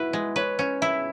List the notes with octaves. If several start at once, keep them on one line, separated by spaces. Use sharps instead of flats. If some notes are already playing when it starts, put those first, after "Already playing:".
Already playing: E4 F#4 B4
G#3
B4 C#5
C#4
E4 E5